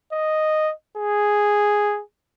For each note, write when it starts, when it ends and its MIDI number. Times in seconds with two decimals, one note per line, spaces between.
0.12 0.72 75
0.97 2.01 68